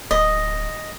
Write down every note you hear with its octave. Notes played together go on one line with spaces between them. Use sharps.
D1 D#5